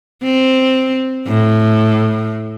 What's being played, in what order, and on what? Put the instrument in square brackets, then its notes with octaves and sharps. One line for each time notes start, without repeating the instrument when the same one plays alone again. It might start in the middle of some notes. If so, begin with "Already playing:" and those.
[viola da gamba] C4
A2